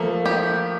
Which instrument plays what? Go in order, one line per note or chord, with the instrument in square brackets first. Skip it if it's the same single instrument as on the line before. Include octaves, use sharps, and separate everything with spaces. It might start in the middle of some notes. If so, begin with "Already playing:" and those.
Already playing: [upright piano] F3 A3 [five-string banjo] A#3
[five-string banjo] G4